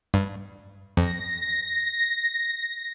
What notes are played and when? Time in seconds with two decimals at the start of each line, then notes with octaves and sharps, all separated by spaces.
0.14 G2
0.97 F2 A#6